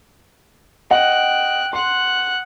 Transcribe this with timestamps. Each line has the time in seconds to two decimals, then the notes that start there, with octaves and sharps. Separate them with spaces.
0.91 D#5 F#5 G5 F#6
1.73 F#5 C6 F#6